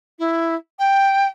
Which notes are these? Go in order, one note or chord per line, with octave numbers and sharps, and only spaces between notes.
E4
G5